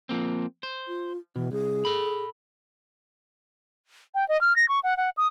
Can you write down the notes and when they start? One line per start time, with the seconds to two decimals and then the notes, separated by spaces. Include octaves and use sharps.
0.09 F3 A#3 C4
0.63 C5
0.88 F4
1.36 B2 E3
1.52 C2 G#4
1.85 A4 B5
4.15 G5
4.28 D#5
4.41 F6
4.56 A#6
4.68 C#6
4.83 F#5
4.97 F#5
5.17 D#6